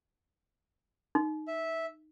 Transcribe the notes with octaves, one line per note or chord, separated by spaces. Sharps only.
D#4
E5